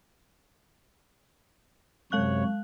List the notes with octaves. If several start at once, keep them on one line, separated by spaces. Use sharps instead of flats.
F#2 C3 G#3 C#5 F5 F#6